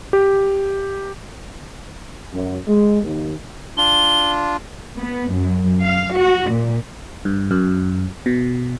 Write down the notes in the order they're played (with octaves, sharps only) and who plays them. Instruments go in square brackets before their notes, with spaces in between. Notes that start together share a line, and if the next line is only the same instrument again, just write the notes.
[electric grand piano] G4
[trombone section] F#2
G#3
D#2
[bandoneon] D4 F4 [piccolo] G7
[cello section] B3
F#2
F5
F#4
A#2
[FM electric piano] G2
F#2
B2